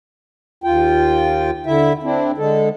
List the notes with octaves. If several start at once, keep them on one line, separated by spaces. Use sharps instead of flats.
D#2 F4 G5
D3 E4 E5
C4 D4 E4
D3 G#3 A4